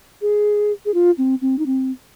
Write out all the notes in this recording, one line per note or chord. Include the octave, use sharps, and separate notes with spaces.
G#4
G#4
F4
C4
C4
D#4
C4